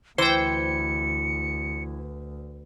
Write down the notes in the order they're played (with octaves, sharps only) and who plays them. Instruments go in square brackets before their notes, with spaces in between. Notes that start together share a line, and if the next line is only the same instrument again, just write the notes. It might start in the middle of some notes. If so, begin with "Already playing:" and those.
[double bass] D2 [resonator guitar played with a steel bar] E3 [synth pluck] C5 G5 [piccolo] C#7